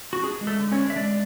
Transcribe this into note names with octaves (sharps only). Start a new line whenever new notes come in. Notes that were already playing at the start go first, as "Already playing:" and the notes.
F#4
D4 G#4
G#3
A3 A4
D3
C#4 C#5
D4
E5
G#3 D4 D5